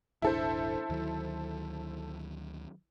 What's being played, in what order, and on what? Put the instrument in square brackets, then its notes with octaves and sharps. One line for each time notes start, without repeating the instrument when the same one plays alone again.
[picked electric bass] E1 A1 D4 [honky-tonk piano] E4 A4 C5
[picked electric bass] D2 D#3 F#3